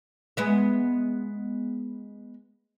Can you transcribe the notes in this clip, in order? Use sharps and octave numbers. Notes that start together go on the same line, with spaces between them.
G#3 B3 E5